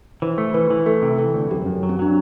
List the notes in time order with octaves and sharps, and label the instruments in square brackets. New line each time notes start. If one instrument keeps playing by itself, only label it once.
[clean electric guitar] E3 [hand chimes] C5
[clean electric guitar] A3
[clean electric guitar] E3 [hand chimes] B4
[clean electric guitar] E3
[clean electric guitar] A3 [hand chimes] A4
[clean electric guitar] C3
[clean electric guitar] E3 [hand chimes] A4
[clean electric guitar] D2
[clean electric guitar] F#2 [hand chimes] G4
[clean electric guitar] F#2
F#3
[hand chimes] C4
[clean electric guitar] F#3 [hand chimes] D4